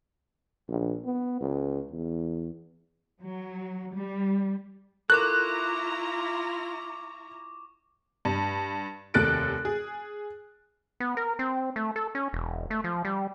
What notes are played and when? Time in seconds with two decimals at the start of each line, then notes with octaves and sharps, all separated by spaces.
0.69 A#1
1.05 B3
1.41 C#2
1.92 E2
3.22 F#3
3.93 G3
5.10 E4 F4 A4 A#4 A#5 C#6 D6 F#6
8.25 G2
9.14 F1 D#2 A4 F#6 A6 D7
9.65 G#4
11.00 B3
11.17 A#4
11.39 C4
11.76 A3
11.96 A4
12.15 C#4
12.33 E1
12.70 A3
12.84 F3
13.05 G3